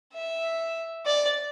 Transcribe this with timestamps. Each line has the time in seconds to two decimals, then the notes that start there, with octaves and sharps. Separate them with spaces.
0.14 E5
1.06 D5